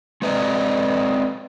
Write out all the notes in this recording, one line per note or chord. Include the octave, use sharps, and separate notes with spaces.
G#3 C4 B4 D5 D#5 A#5